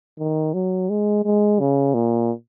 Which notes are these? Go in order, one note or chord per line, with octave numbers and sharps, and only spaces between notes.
D#3
F#3
G#3
G#3
C#3
A#2